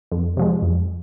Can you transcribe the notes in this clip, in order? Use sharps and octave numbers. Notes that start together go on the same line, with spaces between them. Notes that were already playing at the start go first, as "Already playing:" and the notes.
F2
C3 F3 G#3
F2